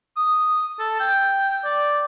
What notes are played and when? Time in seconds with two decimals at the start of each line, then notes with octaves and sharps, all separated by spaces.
0.17 D#6
0.79 A4
1.00 G5
1.65 D5